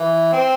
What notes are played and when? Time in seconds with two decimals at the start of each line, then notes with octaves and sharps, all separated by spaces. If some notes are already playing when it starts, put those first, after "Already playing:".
Already playing: E3
0.33 C4